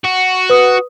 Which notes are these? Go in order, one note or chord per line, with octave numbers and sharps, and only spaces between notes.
F#4
B4 D#6